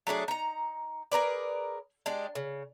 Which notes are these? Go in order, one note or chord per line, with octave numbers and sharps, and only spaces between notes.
F#3 A3 D4 G#4
D#4 A#5
G#4 A#4 B4 D5
G#3 D4 G4
C#3